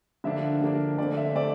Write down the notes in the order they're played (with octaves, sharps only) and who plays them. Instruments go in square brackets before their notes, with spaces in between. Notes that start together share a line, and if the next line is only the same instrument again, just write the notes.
[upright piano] D3 F3 A#3 D4 E5
D3 F3 A#3 D4
D3 A3 C4 D5
E5
D3 A3 C4 D5